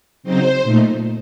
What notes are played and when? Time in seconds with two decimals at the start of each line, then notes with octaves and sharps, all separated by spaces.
0.23 C#3 F#3 C4 D#4 C5
0.63 A#2 A3 D#4